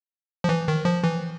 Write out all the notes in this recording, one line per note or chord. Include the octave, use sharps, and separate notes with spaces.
F3
E3
D#3
F3
E3